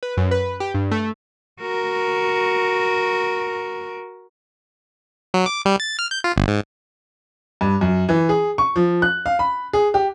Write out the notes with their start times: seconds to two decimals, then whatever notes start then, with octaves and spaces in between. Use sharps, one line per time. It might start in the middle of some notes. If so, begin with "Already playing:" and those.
0.03 B4
0.17 F#2
0.31 B4
0.60 G4
0.74 G2
0.91 A3
1.61 F#4 A#4
5.34 F#3
5.46 D6
5.65 G3
5.80 A6
5.99 F6
6.11 G6
6.24 F4
6.36 G1
6.48 G#2
7.61 G2
7.81 F#2
8.09 E3
8.29 G#4
8.58 C#6
8.76 F3
9.02 F#6
9.26 F5
9.39 B5
9.73 G#4
9.94 G4